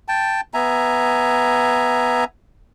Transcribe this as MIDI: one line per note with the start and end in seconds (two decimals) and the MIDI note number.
0.08 0.41 79
0.08 0.41 81
0.54 2.24 59
0.54 2.24 76
0.54 2.24 80
0.54 2.24 82